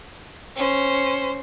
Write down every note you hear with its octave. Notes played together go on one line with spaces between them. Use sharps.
C#4 C5